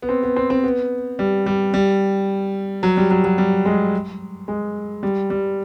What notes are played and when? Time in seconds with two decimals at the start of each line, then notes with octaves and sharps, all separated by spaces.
0.02 B3
0.09 C4
0.23 B3
0.36 C4
0.50 C4
0.64 B3
1.19 G3
1.46 G3
1.74 G3
2.83 F#3
2.97 G3
3.10 F#3
3.24 F#3
3.38 G3
3.65 G#3
4.48 G#3
5.03 G3
5.30 G3